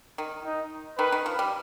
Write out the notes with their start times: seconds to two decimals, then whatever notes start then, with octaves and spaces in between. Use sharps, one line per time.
0.18 D#3
0.45 D#4
0.98 D#3 B4
1.12 D#3
1.26 F3
1.39 G3